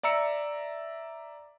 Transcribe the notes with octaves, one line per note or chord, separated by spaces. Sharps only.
D5 E5 A#5 E6 C#7